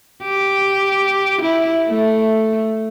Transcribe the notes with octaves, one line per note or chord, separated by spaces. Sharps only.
G4
E4
A3